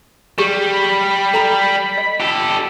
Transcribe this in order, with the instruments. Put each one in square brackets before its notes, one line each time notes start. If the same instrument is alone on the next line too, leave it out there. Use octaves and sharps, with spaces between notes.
[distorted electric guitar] G3 [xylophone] G4 G#4 C#6
[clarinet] B5
[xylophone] A4 A#5 F7
D#5
[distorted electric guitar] G4 A4